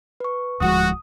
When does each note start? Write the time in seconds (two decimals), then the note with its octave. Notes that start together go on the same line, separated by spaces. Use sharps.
0.20 B4 C#6
0.61 D1 F3 G#3 F#4 D#6